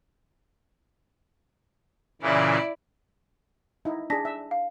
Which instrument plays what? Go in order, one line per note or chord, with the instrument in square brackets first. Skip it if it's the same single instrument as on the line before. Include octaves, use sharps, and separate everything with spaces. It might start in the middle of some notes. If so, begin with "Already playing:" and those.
[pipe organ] A#2 C#3 E3 [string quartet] E4 D5
[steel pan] D#4 E4
[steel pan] D4 G#4 [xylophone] A5 A#6 B6
[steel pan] E5
[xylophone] F5